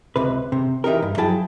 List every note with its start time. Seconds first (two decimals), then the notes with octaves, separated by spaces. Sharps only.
0.16 C#2 C3 B4
0.52 C3
0.84 E3 D#4 G4 A#4
1.02 G2
1.18 F3 F#3 E4 G#4 G5 A5